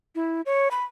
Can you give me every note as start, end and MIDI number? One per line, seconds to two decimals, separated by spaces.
0.15 0.41 64
0.46 0.68 73
0.71 0.84 83